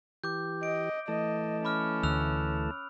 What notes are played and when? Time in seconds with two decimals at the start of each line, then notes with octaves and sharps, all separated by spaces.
0.24 E3 G4 D6 G6
0.63 D#5 D7
1.08 E3 A3 D#5 A5
1.65 C#4 B5 D6 F6
2.03 D2 E6 F#6 F7